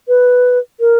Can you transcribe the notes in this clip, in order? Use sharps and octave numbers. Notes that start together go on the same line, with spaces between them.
B4
A#4